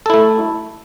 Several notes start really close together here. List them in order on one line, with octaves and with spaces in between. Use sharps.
A4 E4 A3